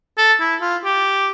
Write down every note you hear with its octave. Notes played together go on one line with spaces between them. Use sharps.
A4
E4
F4
G4